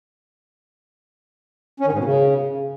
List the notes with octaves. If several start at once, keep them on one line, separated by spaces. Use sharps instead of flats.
C#4
D#3
G#2
B2
C#3